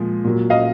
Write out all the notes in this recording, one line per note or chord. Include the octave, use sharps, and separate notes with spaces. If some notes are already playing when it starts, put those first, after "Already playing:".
Already playing: A#2 F3 G#3
A#2 F#3
D#5 F5